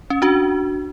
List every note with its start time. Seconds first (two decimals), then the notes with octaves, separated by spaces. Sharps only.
0.10 C#4
0.22 D4 F#4